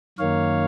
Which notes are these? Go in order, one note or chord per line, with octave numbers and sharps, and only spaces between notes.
F#2 D#3 A#3 C#5 F5